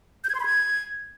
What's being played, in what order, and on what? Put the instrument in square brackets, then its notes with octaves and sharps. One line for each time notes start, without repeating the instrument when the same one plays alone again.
[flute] G6
G#6
C6
B5
G#6